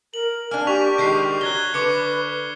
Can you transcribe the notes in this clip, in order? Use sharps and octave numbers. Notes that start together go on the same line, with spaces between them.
A#4 F#7
A#3 D4 G#5 F6
G4 C#6 B6 F7
D#3 G#3 D4 B6 C7
F#3 F#6 G#6 G7
D3 B4 C#6 D6 C#7